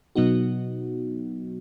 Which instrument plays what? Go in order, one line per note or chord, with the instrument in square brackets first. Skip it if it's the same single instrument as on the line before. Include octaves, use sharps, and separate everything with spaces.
[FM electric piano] B2 F#3 B3 D#4 F#4